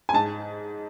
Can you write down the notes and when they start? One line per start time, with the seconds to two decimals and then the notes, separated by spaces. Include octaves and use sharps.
0.09 G#5
0.13 G#2 A5